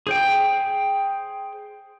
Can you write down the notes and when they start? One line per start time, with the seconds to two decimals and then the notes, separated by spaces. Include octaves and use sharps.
0.07 G#4 C5 G5